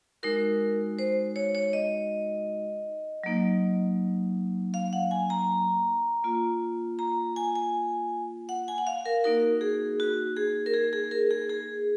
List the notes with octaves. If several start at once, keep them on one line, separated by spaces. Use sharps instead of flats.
G#3 D#4 F#4 A#4
C5
C#5
C#5
D#5
F#3 A#3 D#4
F5
F#5
G#5
A#5
A#3 F4
A#5
G#5
G#5
F#5
G#5
F#5
F5
A#4
A#3 D#4 F#4 A#4
G#4
F#4
G#4
A#4
G#4
G#4
A#4
G#4
G#4